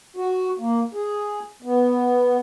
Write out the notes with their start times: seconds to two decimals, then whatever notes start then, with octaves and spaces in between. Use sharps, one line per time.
0.17 F#4
0.59 A#3
0.94 G#4
1.62 B3